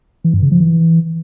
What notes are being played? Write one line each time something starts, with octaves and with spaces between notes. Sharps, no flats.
E3
G2
C#3
F3
E3